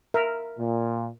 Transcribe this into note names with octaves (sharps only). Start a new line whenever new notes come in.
A#4 E5
A#2